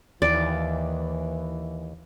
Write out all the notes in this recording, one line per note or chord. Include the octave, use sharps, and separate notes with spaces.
D#2 E3 D5